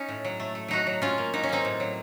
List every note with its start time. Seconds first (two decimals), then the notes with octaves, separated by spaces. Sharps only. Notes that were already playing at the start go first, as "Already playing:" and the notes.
Already playing: C#4 D#4
0.08 A2
0.24 F#3
0.40 A3
0.55 A3
0.68 F#3 D#4 F#4
0.87 F#3
1.02 F#3 C#4 F4
1.18 A#3
1.34 F#3 D#4
1.43 C#4
1.49 A#3 C4 D#4
1.65 A2
1.80 F#3